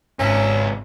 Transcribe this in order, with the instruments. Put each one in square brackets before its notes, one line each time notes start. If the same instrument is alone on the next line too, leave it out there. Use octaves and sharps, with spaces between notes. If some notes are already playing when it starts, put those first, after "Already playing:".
[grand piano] G#1 [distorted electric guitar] C#2 E5 [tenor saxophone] C#4